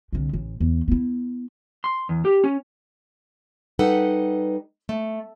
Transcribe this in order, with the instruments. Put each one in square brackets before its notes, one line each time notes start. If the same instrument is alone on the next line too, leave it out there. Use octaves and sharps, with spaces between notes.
[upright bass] C2 D3
A1
E2
B3 E4
[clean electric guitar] C6
E2
G4
C#4
[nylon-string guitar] G3 D#4 A4 B4 F#5
A3